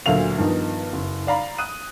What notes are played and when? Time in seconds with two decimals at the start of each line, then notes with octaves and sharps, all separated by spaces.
0.06 D2 A#2 F#3 A3 F5 F7
0.38 G2 D#3 F3 B3 D#4
0.93 F#1
1.27 D5 F5 A#5 B5
1.58 D#6 F#6 D#7